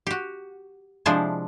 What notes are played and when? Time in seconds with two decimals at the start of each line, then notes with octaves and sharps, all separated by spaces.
0.07 F#4 G4
1.06 C3 F3 G#3 D4 E4 C5